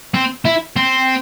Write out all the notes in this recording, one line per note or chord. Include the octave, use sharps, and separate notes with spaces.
C4
E4
C4